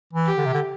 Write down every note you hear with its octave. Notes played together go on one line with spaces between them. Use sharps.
E3
G4
D3
C3
D3